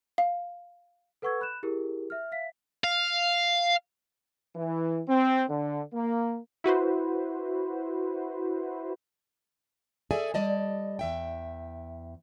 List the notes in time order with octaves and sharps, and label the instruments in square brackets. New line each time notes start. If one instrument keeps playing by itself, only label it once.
[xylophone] F5
[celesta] A4 B4 F#5 C#6 E6 G#6
B5 F#6 G6 E7
E4 G4 G#4 A#4
E5 F6
E5 F5 B6
[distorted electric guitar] F5
[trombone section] E3
C4
D3
A#3
[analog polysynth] E4 F#4 B4 C5
[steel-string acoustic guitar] G#4 A4 D5 E5 G#5
G3 D5 D#5 A5
E2 E5 G5